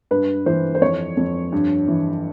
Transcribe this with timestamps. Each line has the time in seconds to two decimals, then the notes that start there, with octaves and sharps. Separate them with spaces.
0.11 G2 B4
0.46 E3 C5
0.75 C5
0.81 F2 C#5
1.17 F2
1.52 G2
1.88 E3